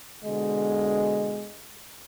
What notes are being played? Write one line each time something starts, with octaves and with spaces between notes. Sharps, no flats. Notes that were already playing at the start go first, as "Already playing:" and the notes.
B2 D3 G#3 D#5